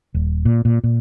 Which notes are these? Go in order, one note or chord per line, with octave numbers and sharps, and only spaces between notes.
D#1
A#2
A#2
A#2